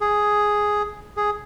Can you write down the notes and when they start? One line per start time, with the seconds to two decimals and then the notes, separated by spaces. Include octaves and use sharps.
0.01 G#4
1.17 G#4